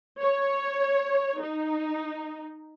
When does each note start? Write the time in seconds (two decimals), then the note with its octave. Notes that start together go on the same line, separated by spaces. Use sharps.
0.20 C#5
1.41 D#4